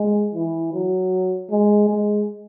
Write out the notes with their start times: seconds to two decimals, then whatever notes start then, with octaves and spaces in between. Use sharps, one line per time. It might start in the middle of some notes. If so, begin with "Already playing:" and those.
Already playing: G#3
0.35 E3
0.73 F#3
1.50 G#3
1.88 G#3